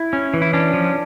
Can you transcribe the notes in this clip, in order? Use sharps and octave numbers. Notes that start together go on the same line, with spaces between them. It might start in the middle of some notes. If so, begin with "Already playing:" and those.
Already playing: E4
C#4
E3
E4
C#4 D4
F3